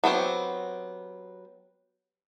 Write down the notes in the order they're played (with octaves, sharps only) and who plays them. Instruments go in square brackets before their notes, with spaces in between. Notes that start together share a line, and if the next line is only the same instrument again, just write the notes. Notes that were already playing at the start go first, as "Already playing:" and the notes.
[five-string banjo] F#3 B3 C4 G4